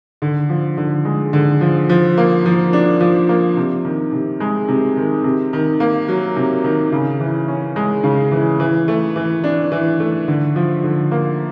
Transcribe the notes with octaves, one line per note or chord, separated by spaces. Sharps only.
D3
F3
D3
G#3
D3
F3
F3
A#3
F3
D4
F3
A#3
C3
D#3
C3
G#3
C3
D#3
C3
D#3
A#3
F#3
C3
D#3
C#3
E3
C#4
G#3
C#3
E3
E3
A3
E3
D4
E3
A3
D3
F3
D3
A#3